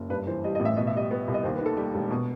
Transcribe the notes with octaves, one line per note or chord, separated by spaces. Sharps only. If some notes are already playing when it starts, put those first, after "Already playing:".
Already playing: F#1
G2 B4
E3 C5
G3 D#5
D#5
A1
E5
B2 D#5
E5
G3 D#5
B3
C2
D#5
D#2 C5
B4
D#3 A4
G3 G4
E1
B2